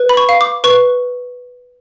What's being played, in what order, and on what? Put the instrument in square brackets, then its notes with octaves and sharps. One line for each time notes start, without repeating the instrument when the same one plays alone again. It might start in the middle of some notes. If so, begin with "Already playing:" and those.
Already playing: [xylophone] B4
B5
C#6
F5
D6
B4 C#6